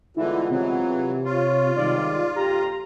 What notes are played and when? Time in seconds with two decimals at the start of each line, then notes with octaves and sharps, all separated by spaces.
0.17 G1 D3 E3 G#3 B3 E4 F4
0.50 C3 E3 F#3
1.25 F4 C#5
1.76 G#2 D#3 G3 D5
2.36 A#1 F2 G4 A#5